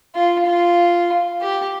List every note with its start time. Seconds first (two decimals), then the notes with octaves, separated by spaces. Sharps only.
0.15 F4
0.46 F4
1.41 G4